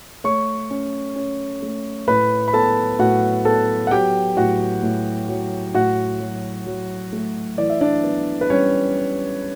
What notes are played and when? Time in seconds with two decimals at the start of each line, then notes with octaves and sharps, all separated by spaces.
0.24 A3 C#5 C#6
0.70 C#4
1.16 C#4
1.62 A3
2.08 A2 B4 B5
2.48 B5
2.53 B3 A4 A5
2.99 A2 F#4 F#5
3.45 B3 A4 A5
3.87 F#5
3.91 F#3 G4 G5
4.37 A2 F#4 F#5
4.83 A2
5.29 F#3
5.75 A2 F#4 F#5
6.20 F#3
6.66 F#3
7.13 A3
7.58 E3 D5
7.70 E5
7.81 D4 D5
8.04 B3
8.41 B4
8.50 G3 C#4 C#5